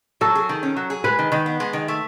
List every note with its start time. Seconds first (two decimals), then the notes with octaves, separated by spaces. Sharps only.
0.21 F#3 A4
0.35 G#4
0.49 D#3
0.63 C#4
0.77 F#3
0.90 G#4
1.04 G#3 B4
1.19 D#3
1.32 D#3
1.46 B3
1.60 G#3
1.73 D#3
1.88 A3